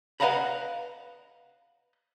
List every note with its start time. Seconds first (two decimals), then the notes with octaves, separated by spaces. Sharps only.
0.20 B4 D#5 F5 F#5 A#5 B5